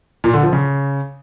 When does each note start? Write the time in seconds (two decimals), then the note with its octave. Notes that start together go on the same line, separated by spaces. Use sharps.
0.24 A#2
0.34 D3
0.43 F3
0.53 C#3